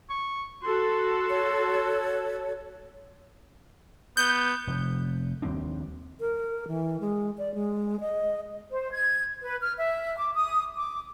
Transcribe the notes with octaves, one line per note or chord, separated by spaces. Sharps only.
C#6
F#4 A4 C6
C#5
B3 G6
F1
D#2 G3 C4 D4
A#4
E3
G#3
D5
G#3
D#5
C5
G#6
B4
F6
E5
D6
D#6
D6